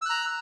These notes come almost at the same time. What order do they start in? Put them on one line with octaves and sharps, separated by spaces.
E6 F#6 A#5